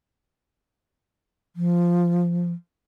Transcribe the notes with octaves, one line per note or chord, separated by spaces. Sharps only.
F3